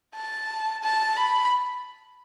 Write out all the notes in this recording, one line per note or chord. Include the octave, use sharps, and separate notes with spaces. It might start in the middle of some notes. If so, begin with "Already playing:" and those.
A5
A5
B5